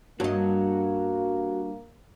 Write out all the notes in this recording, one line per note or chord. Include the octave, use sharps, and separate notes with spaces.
G2 A#3 F#4 C#5 D#5